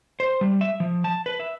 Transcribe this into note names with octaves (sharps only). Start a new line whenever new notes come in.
C5
G3
E5
F3
A5
B4
E5